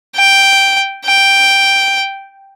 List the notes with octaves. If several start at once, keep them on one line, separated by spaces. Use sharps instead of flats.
G5
G5